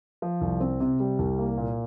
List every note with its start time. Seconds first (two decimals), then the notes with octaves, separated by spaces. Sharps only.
0.22 F3
0.41 C2
0.60 C4
0.80 C3
1.00 G3
1.19 C2
1.39 A#3
1.58 A#2